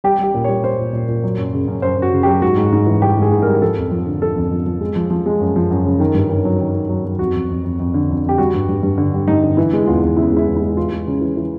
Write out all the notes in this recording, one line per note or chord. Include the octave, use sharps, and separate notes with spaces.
G3 G4
G3 G4
A#2
G3 C#5
G3 C5
A#2
A#2
A#2
F#3
F#2
C#3
F#2
F#2 C5
F#2
F#4
C#3
F#3 G4
G#2 F#4
G#2
G#2
E3
G3 G4
G#2
G#4
G#2
G3 A#4
F3 A4
F2
F3
D3
F3 A4
F2
F3
F3
G#3
F3
F3
G#3
F#2
F3
F#2
C#3
D#3
G2
D#3
F#3
D#3
D#3
F#3
F#3
F2 F#4
F2
F2
F2
F2
D3
F2
F2 G4
G3 F#4
G2
G2
G2
D3
G3
G2 D#4
D3
E3 E4
G#3
E2 F4
E2
C#3 E4
G#3 E4
E2
E4
G#3
E3 F4
G#3
C#3
E3
E3